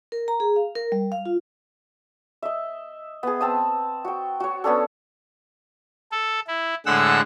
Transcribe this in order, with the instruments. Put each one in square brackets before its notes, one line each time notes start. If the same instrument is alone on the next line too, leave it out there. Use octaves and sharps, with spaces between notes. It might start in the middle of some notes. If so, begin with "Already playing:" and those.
[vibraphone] A#4
A#5
G#4
F5
A#4
G3
F5
F4
[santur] D#5 E5
B3 G#4
C4 A5 D#6
F#4 G5
F#4 C#5
B3 C#4 D4 A4
[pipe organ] A4
E4
A2 D3 G#3 F#5 E6 F#6